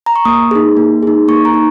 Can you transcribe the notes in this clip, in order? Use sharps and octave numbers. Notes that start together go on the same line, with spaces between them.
A#5
C#6
A#3 D#6
D#4 G#4
A#3
D#4 G#4
A#3 C#6
A#5
D#4